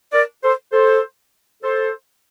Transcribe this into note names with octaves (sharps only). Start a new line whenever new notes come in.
A#4 D5
A4 C5
A4 C5
A4 C5